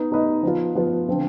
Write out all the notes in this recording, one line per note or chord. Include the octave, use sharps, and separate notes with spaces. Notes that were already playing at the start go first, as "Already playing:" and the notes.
Already playing: B3 D#4 B4 D#5
B3 D#4 B4 D#5
F3 B3 F4
F3 B3 F4
D3 F3 C4